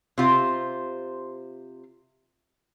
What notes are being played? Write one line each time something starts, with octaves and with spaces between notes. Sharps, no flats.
C3 F4 C5